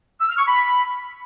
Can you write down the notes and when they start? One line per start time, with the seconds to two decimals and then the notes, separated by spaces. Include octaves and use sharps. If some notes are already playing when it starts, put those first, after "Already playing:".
0.21 E6
0.30 F6
0.38 C#6
0.47 B5